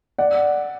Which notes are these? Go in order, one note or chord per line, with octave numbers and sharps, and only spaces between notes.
D5 F#5